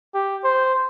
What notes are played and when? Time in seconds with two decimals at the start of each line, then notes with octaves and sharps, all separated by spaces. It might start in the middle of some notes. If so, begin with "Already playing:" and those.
0.15 G4
0.44 C5